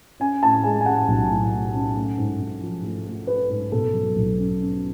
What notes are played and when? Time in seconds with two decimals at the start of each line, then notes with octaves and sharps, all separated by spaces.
0.20 C#4 G#5
0.43 A2 A5
0.64 G#3 G#5
0.81 G#5
0.86 C#4 F#5
1.08 B1
1.30 A2
1.52 A2
1.74 C#4
1.96 A3
2.18 G#2
2.40 G#2
2.62 F3
2.84 A3
3.06 A3
3.27 A3 B4
3.50 G#2
3.72 B2 A4
3.93 F#3
4.16 B1
4.38 C#4
4.60 C#4